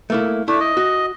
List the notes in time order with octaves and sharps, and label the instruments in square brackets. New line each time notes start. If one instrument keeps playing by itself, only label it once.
[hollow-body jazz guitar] A3 A#3 E4
[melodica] A3 D4 [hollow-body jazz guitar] E4
[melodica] D#5
[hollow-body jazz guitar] F#4